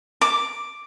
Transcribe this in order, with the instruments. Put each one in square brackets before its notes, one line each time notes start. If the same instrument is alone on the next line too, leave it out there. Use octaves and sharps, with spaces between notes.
[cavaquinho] D6